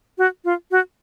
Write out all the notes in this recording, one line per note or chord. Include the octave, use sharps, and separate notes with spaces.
F#4
F4
F#4